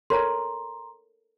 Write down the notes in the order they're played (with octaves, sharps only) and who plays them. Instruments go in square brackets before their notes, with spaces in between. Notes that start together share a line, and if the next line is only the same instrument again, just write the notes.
[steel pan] A4 A#4 C#5 [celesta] A#5 C6